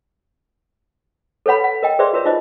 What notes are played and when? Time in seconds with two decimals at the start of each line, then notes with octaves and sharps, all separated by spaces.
1.46 A4 B4 C#5 F#5 B5
1.64 F#5
1.83 A#4 D#5 G5
1.99 G#4 B4 C5 D5 E5 C6
2.13 F4 F#4 A#4 B4 C#5 E5
2.25 D#4 F4 C5 D#5